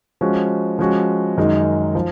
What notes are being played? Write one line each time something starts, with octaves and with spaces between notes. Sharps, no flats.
F3 G#3 C#4 F#4
F3 G#3 C#4 F#4
F#2 D#3 G#3 D#4
F3